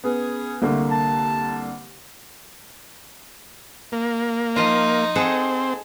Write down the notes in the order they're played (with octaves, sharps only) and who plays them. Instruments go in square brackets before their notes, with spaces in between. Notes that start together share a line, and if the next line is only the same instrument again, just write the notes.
[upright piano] B3 [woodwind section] C#4 G#4
[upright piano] C2 D3 A#3 [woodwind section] A3
[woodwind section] A5
[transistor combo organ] A#3
[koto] F3 F4 [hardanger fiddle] D#4
[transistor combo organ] C4 [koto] G#4 A4 F#5